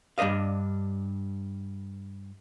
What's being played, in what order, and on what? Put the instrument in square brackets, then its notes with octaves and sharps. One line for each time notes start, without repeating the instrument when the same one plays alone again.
[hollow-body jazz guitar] G2 D4 C5 D#5 F5